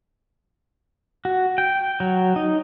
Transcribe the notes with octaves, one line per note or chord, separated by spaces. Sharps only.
F#4
G5
F#3
D#4